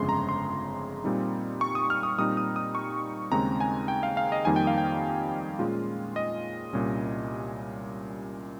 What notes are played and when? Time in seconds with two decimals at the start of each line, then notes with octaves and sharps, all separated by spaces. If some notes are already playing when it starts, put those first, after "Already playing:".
Already playing: G1 F2 C#3 G#3 C6
0.09 A#5
0.29 C6
1.04 A#2 G3 C4 D#4
1.61 C#6
1.75 D#6
1.90 F6
2.03 D#6
2.18 A#2 G3 C4 D#4 D#6
2.37 D#6
2.56 D#6
2.75 C#6
3.31 D#2 C#3 G#3 C4 D#4 A#5
3.60 G#5
3.88 G5
4.03 F5
4.17 F5
4.32 D#5
4.45 F2 D#3 G3 A#3 D#4 G#5
4.56 G5
4.67 F5
4.78 G5
5.59 A#2 G#3 C#4 F4
6.16 D#5
6.73 C2 A#2 G3 C#4